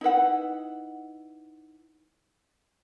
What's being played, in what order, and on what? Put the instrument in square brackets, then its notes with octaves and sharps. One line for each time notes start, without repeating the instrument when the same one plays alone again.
[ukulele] D#4 E4 B4 F#5